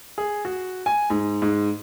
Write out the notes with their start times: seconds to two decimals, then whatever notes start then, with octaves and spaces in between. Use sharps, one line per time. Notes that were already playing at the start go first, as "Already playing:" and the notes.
0.18 G#4
0.45 F#4
0.86 G#5
1.10 G#2
1.42 G#2